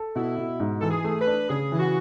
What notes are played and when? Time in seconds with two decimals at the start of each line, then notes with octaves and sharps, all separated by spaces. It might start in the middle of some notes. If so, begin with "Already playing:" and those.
Already playing: A4
0.16 B2 E4
0.38 B2
0.60 G#2
0.81 E3 A4
0.90 G#4
1.04 A3
1.20 B4
1.27 D4
1.49 C#3 G#4
1.72 E3 E4
1.79 F#4